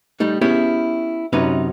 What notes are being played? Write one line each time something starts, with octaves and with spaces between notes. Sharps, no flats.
G3 A3 D#4
B3 C#4 E4 G4 G#4
F#2 C3 C#4 D#4 B4